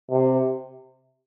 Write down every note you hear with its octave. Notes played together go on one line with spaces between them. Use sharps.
C3